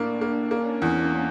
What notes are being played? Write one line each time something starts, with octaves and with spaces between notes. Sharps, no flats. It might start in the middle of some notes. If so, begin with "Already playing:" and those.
Already playing: A2 A#3 D4
A#3
A#3 C#4
E2
A#3